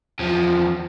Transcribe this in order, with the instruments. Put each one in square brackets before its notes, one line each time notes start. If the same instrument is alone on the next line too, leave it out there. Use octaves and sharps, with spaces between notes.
[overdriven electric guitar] E2 F3